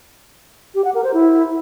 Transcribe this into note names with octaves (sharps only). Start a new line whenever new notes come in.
G4
F#5
A#4
C5
E4